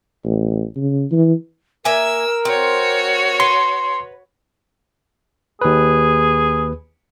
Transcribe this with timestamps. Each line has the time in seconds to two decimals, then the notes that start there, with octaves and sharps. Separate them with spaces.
0.24 A1
0.76 C#3
1.12 E3
1.85 A#3 A#4 E5 G#5 E6
2.45 C4 F#4 C#5
3.40 B4 C6
5.61 D#2 G#4 B4